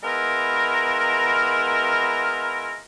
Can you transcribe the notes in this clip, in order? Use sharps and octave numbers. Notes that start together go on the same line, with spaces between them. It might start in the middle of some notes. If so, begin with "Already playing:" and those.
G#3 B3 E4 F4 A#4